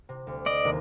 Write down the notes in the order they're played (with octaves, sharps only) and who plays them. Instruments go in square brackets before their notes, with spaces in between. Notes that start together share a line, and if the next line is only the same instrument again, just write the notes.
[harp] C3
D2
[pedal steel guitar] D5 D#5
[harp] D#2 C3